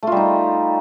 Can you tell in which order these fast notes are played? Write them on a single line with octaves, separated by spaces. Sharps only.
A3 F4 G3 D#4